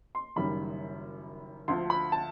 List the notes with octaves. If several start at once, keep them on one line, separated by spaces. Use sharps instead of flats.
C6
F#1 F#2 D#3 G3 B5
D2 D3 F3 C6
B5
A5